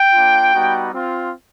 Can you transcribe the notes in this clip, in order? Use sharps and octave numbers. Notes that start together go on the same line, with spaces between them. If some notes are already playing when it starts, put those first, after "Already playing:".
Already playing: G5
A#3 D4 F4
G3 B3 D#4 F#4
C4 F4